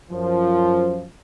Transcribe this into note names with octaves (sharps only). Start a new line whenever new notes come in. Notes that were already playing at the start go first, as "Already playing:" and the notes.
F#2 F3